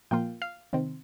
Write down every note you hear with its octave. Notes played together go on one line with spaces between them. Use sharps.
A#2 F3 A#3 F4 G5
F5
C3 D#3 C4